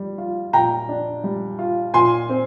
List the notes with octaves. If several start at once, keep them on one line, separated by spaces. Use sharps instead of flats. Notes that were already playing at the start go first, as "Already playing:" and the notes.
Already playing: G3
F4
A#2 G5 A#5
D4
G3
F4
A#2 G#5 C6
C4